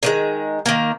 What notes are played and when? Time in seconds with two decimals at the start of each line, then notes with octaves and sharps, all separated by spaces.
0.03 D3 D#3 G#3
0.66 D#3 A#3